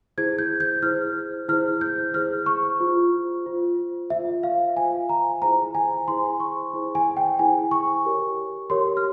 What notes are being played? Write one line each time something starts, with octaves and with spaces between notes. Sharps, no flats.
E4 G#4 C5 G#6
G6
G6
E4 G#4 C5 F6
E4 G#4 C5 F6
G6
E4 G#4 C5 F6
C#6
F4 C5
F4 C5
F4 C5 E5
F5
F4 C5 G#5
A#5
E4 G#4 C5 A#5
G#5
E4 G#4 C5 C6
C#6
E4 G#4 C5
G#5
G5
E4 G#4 C5 G#5
C#6
G4 A#4 C#5
G4 A#4 C#5 C6
F6